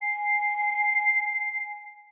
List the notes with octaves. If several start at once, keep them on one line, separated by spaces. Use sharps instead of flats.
G#5 C7